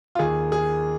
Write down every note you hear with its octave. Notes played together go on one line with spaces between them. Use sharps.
F4
D#2 D#3 G#4
G#4